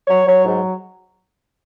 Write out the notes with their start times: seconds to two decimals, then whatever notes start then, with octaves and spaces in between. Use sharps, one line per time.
0.08 F#3 C#5
0.27 F#3 C#5
0.45 G#2